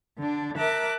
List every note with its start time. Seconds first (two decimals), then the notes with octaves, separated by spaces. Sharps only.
0.17 D3 D4
0.57 A#4 E5 A5 D6 F#6